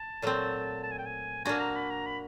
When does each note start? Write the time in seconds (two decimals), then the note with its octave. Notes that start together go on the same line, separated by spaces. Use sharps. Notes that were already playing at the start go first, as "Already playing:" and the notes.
Already playing: A5
0.22 A#2 F#3 A3 C4
0.83 A5
0.91 G#5
0.98 G5
1.06 G#5
1.44 A#3 D4 F#4 G#5
1.60 A#5
1.76 B5
1.90 A#5
2.06 B5